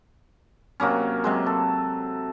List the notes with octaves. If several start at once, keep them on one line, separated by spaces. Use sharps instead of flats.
C3 F#3 A#3 C#4
C3 F#3 G#3
A4